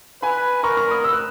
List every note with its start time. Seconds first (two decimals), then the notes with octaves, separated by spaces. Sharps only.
0.23 B4 G#5 B5
0.63 A#4 A#5 C#6
0.77 A#5 C#6
0.91 B5 D#6
1.04 E6
1.13 F#6